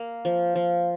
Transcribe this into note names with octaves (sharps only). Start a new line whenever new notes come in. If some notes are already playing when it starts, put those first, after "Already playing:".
Already playing: A#3
F3
F3